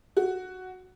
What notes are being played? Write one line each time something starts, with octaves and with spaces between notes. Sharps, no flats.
F#4